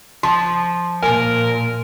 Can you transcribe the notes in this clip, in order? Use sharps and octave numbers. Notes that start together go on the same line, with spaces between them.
F3 C6
A#2 A#4 G#5